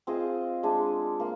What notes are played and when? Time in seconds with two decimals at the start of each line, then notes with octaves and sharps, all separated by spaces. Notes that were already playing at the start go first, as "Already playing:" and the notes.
0.07 C4 F4 G#4 D#5
0.63 G#3 D4 G#4
1.20 A#3